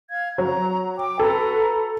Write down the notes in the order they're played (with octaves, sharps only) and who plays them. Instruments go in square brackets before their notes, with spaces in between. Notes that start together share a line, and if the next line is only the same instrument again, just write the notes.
[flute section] F5 G#6
[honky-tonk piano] F#3 [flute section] A#5
[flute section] G5 D6
[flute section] F#4 B4 A#5 [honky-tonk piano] A4